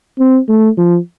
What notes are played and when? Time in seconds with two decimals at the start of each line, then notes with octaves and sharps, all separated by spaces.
0.19 C4
0.49 A3
0.77 F3